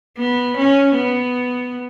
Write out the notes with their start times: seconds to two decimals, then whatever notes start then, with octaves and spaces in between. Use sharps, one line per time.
0.18 B3
0.57 C#4
0.95 B3